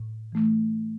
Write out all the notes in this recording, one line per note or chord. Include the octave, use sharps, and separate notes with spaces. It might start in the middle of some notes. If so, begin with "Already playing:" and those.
Already playing: A2
E3 A3